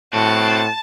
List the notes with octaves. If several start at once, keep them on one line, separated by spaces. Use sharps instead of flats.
A2 C4 F#4 A5